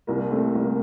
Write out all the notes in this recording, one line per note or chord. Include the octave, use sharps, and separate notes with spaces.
C2 A#3
A3 C4
C2 A#3